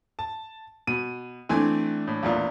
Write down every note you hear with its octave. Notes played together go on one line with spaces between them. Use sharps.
A5
B2 D#7
E3 A3 C4 D4 G#5
A2
A1 E2 A#2